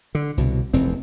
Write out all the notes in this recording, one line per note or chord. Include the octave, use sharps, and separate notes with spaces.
D3
C2 B2
F1 E2 C4